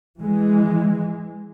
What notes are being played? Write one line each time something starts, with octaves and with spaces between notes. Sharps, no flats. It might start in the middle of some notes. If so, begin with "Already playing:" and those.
E3 G#3